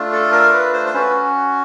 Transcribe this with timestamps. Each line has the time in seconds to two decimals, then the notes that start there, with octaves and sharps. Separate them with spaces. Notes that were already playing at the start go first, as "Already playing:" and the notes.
Already playing: A3 D4 F4
0.13 A4
0.32 A#4
0.53 B4
0.73 C5
0.86 C5
0.94 C#4 F#4 B4